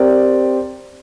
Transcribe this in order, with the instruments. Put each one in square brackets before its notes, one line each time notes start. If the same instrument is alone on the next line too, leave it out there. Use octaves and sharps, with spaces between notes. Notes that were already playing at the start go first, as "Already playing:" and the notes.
Already playing: [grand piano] C4 G4 A#4 D5